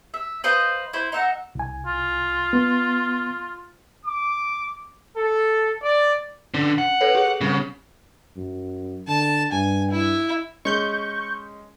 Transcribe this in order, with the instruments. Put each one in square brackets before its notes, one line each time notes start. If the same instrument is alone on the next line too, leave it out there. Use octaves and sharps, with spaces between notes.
[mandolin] E5
B4 C5 D#5 F5
E4 C5
D#4 E5 F#5
[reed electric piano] C2 G#5
[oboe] F4
[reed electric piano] B3
[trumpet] D6
A4
D5
[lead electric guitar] D3 [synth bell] C#4
[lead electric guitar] F#5
[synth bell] A4 B4 C#5
G4 G#4
[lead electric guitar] C#3 [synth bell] G3 C4
[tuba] F#2
[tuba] D3 [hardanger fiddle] A5
[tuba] G2 [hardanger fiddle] G#5
[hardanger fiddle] E4
[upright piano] G#3 C#4 [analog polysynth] C#6 G6